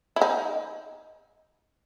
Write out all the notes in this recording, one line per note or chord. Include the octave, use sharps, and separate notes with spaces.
E4
D#4